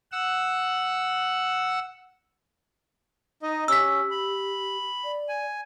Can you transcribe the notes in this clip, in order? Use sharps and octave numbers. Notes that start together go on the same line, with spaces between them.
F#5 E6
D#4 D#5
C#4 G4 E6 B6
B5
D5
G#5